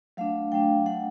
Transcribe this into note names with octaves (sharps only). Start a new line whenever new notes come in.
F#3 A3 D4 F5
F#3 A3 D4 G5
F#3 A3 D4 F#5